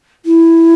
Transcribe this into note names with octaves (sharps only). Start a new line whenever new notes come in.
E4